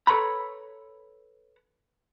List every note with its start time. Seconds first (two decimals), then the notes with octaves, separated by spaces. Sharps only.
0.07 A4 B4 C#5 A#5 B5